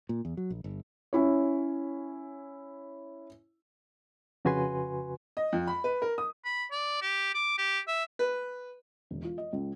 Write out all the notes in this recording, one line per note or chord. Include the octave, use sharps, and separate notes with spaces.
A#2
E2
F#3
A#1
G1
C#4 E4 C#5
F2 C#3 F#4 B4 G#5 C6
D#5
F2
B5
B4
A#4
D#6
B5
D5
G4
D6
G4
E5
B4
E1
F4
D#5
C#2